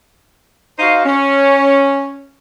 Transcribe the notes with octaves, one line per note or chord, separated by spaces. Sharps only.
D#4 F#4 C5 F5
C#4